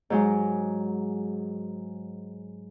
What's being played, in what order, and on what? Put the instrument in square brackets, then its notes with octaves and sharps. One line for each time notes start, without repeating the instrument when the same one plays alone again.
[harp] G#2 F#3 G#3